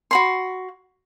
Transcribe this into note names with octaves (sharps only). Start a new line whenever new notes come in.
F#4 B5 C6